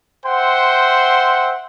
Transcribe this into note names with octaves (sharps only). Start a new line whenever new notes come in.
C5 E5 F#5 G5 C6